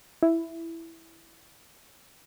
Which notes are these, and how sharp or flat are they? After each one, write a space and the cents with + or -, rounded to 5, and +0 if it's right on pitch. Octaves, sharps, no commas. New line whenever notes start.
E4 +0